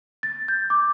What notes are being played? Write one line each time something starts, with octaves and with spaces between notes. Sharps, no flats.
A6
G6
D6